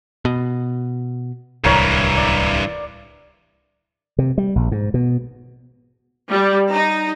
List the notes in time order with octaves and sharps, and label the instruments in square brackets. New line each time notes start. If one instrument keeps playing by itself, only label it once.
[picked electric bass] B2
[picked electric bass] D1 C2 [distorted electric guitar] G2 E3 [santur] A#4 C#5
[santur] D5
[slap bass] C3
G3
A#1
G#2
B2
[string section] G3
D#4